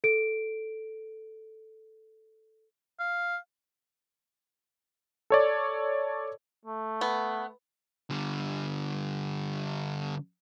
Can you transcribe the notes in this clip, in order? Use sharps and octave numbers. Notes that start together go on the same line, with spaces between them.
A4 D7
F5
A4 C#5 D5
A3
B3
D3 G3